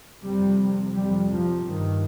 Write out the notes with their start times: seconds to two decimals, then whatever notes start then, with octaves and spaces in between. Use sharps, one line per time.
0.23 F2 C3 G3
0.94 F2 C3 G3
1.30 F3
1.65 G2 D#3